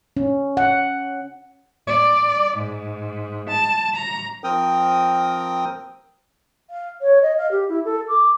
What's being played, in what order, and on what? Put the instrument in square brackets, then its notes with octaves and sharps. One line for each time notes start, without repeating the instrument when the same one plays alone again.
[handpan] C#4
F#5
[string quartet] D5
G#2
A5
A#5
[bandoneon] F3 C4 A#4 G5 D#6
[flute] F5
C#5
D#5
F5
G4
E4
A4
D6